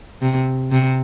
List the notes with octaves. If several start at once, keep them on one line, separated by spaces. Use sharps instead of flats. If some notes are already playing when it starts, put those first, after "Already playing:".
C3
C3